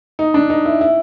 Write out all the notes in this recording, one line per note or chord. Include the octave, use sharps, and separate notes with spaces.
D#4
D4
D#4
E4
E4